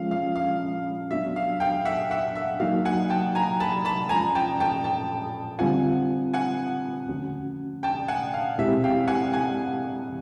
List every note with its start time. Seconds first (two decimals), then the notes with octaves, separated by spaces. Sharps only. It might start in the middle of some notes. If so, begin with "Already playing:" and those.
Already playing: F3 G#3 C#4 F4 F5
0.11 F5
0.36 F5
1.11 F#3 B3 D4 F#4 E5
1.36 F5
1.60 F5 G5
1.85 E5 F#5
2.11 E5 F#5
2.35 E5
2.60 F#3 A#3 D#4 F#4 F5
2.85 F#5 G#5
3.10 G5 A5
3.35 G#5 A#5
3.60 A5 B5
3.85 A5 B5
4.09 F3 G#3 C#4 F4 G#5 A#5
4.35 G5 A5
4.60 G5 A5
4.84 G5 A5
5.59 D3 G3 C4 F4 F#5 G#5
6.34 F#5 G#5
7.09 D3 F3 A3 C#4 F#4
7.83 G5 A5
8.08 F#5 G#5
8.34 F5
8.58 B2 G#3 C4 E4 G4 E5
8.84 F5 G5
9.08 F#5 G#5
9.33 F#5 G#5